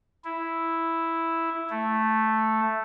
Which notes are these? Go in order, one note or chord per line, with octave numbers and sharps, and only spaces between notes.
E4
A3